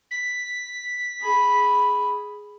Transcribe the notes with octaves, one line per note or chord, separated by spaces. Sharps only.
B6
G#4 B5